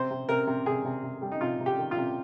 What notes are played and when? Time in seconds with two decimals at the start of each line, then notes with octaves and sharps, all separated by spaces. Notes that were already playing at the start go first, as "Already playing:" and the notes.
Already playing: C3 C5
0.10 C3
0.29 C3 A#4
0.47 C3
0.66 C3 G#4
0.85 C3
1.03 C3
1.22 G3
1.32 D#4
1.41 C3 F4
1.60 C3
1.66 G4
1.78 D#3
1.91 F4
1.97 C3